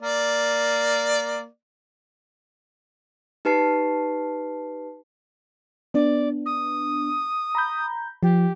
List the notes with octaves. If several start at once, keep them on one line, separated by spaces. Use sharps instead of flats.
A#3 D5
D#4 G4 B4 A5 C7
B3 D4 D5
D#6
A#5 B5 G6
F3 G4